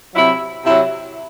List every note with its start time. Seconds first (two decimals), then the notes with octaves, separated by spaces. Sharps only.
0.15 C3 F#3 E4
0.65 C3 F#3 E4